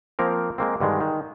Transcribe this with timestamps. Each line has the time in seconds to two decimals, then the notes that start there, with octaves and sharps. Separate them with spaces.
0.19 F3 A#3 C4 A#4
0.58 G#3 A#3 C4
0.80 G2 D3 D#3 G#3
1.00 D#3